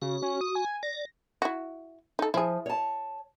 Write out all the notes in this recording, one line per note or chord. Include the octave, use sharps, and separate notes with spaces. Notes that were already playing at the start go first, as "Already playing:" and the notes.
C#3 F#4
C#4
D#6
G#5
D5 A#6
E4 F#4
D#4 A4
F3 E4 G#4
C#5 A5